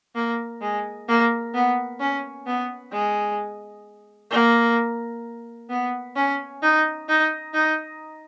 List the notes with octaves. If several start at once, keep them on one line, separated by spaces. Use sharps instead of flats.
A#3
G#3
A#3
B3
C#4
B3
G#3
A#3
B3
C#4
D#4
D#4
D#4